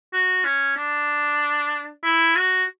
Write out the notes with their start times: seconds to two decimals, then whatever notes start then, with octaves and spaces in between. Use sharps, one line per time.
0.13 F#4
0.45 C#4
0.77 D4
2.04 E4
2.36 F#4